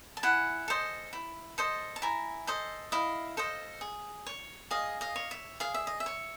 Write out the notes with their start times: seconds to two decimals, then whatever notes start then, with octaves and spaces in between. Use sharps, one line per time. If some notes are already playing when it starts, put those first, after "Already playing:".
0.17 A5
0.23 E4 F#5 G#5
0.68 A4 C5 D#5
1.13 E4
1.58 A4 C5 D#5
1.96 A5
2.02 E4 G#5 A#5
2.47 A4 C5 D#5
2.92 E4 D#5 F5
3.37 A4 C5 D#5
3.81 G#4
4.26 C#5
4.71 G#4 D#5 F5
5.01 D#5 F5
5.16 C#5
5.31 E5
5.60 G#4 F5
5.74 E5
5.87 D#5
6.00 E5
6.06 C#5